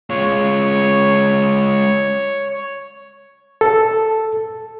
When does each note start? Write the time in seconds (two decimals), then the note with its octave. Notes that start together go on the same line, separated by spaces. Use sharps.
0.10 G#3 F4 C#5
3.61 A4